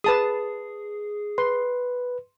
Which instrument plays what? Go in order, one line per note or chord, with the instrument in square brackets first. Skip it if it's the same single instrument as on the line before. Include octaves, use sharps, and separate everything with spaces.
[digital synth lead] G#4 [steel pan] B4 A5 D#6
[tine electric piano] B4 [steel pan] C6